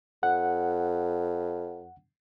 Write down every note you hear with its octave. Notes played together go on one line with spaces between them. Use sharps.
F2 F#5